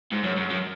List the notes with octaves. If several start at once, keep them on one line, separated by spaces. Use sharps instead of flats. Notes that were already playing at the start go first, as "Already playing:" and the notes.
G#2
F#2
F#2
F#2